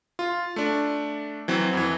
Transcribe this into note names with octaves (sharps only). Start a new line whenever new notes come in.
F4
A3 D4
E3 F#3 C4
F2 E3